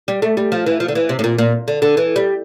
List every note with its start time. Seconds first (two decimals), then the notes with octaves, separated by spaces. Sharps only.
0.08 G3
0.22 A3
0.37 G3
0.52 F3
0.66 E3
0.80 F3
0.88 D3
0.95 E3
1.09 C3
1.19 A2
1.24 A#2
1.38 A#2
1.68 D3
1.82 D3
1.97 E3
2.16 G3